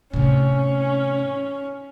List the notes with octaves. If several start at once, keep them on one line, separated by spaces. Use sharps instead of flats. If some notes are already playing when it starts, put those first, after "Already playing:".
A2 C3 C#4